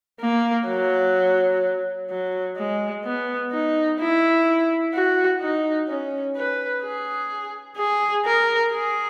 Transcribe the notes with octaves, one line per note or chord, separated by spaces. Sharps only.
A#3
F#3
F#3
G#3
B3
D#4
E4
F#4
D#4
C#4
B4
G#4
G#4
A#4
G#4